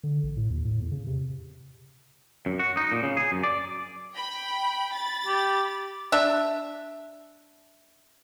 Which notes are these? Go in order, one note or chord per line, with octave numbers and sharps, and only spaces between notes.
D3
A1
A2
D#2
A2
E2
C#3
C3
F#2
F#4
D#4
A#2
C#3
G#4
F#2
D5
G5 B5
B5 A6
G4
D4 E5